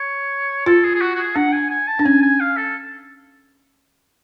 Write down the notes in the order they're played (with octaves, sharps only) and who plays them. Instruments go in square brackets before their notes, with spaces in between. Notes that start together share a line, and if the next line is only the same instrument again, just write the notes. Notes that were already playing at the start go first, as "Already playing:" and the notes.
Already playing: [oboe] C#5
[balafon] F4 [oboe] A4
[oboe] G#4
G#4
F#4
F#4
G#4
[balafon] D4 [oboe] F#5
[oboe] G#5
G#5
A5
[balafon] D4
[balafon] C#4 [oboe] G#5
[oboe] G#5
F5
A4